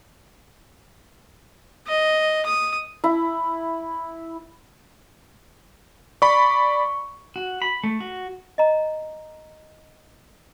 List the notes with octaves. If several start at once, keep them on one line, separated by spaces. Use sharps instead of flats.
D#5
D#6
E4
D5 B5 C#6
F#4
B5
A3
F#4
D#5 A#5